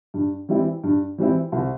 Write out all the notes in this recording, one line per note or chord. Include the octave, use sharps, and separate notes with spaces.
G2
E3 G3 C4 E4
G2
E3 G3 C4 E4
C2